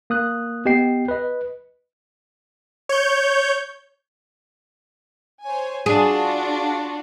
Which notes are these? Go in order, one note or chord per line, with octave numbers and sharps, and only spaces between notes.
A#3 D#6 F#6
B3 G4 D#5 G5 C7
B4 D#5
C#5 G6
C5 C#5 G#5
D4 F4 F#4 G#4